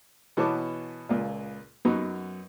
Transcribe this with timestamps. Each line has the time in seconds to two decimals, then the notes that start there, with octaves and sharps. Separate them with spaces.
0.37 B2 E3 B3 C#5 A5 D6
1.09 C#2 A#2
1.85 F#2 F#3 B3 D#4